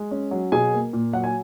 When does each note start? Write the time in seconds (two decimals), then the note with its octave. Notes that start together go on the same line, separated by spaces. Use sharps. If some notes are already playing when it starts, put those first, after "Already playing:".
Already playing: G#3
0.11 C#4
0.31 F#3
0.52 B2 G#4 G#5
0.73 A#3
0.93 A#2
1.13 F#3 F#5
1.24 G#5